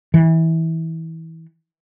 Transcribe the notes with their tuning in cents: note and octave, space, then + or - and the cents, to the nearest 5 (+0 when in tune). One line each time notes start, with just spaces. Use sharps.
E3 -25